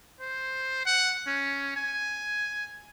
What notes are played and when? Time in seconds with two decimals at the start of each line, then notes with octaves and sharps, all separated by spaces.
0.21 C5
0.86 F#5
1.27 C#4
1.76 G#5